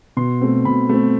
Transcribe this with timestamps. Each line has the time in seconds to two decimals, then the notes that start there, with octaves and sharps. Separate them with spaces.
0.17 B2 C6
0.41 A3 C4
0.65 B2 B5
0.89 A3 C4